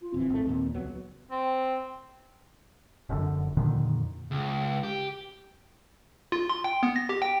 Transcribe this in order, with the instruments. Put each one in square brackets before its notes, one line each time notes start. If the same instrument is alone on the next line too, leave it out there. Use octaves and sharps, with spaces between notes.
[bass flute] F4
[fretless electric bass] D1 E3 [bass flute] C4
[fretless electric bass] G#1 A3
D#2 A#2
C#2 F#3 B3
[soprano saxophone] C4
[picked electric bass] F1 F#2 D3
F2 A#2 D3 D#3
[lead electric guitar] C#2
G4
[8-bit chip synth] F4
C6
G5
B3
A#6
G4
G5